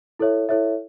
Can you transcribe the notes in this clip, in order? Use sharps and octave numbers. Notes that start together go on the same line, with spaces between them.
E4 A4 C#5 E5
E4 A4 C#5 E5